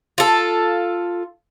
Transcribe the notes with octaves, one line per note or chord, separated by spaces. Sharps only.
F4 A4